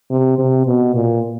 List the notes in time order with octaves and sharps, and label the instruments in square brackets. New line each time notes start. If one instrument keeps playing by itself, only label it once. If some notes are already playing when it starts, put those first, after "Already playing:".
[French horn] C3
C3
B2
A#2